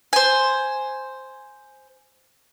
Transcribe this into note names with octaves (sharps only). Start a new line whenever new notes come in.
C5 G#5